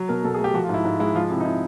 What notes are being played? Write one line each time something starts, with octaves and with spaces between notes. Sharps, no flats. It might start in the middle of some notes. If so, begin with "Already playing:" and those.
Already playing: F#3
B2 A#4
B2 A4
G#4
A3
G4
F3 F#4
F4
G#2
E4
G#2
G#3 E4
F3 F4
C3 E4
D#4
C3 E4